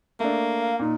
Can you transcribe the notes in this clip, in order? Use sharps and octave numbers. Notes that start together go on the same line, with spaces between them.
A3 A#3 D4
F5
A#2 D#4